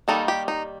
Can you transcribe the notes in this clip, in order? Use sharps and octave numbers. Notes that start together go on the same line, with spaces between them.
D#3 G3 A#3 D#4 A4
G4
D#4